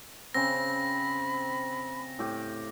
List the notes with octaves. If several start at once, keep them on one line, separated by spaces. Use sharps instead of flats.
C#3 C4 B5 A#6
A2 G4